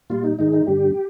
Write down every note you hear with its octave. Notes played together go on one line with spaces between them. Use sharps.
A#2 G3 F4
D#4
G#2 D#3 G#3 D#4
D#4
G2 D3 G3 G4